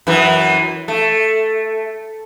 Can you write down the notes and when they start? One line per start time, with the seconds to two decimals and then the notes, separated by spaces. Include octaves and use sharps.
0.07 F#2 E3
0.88 A3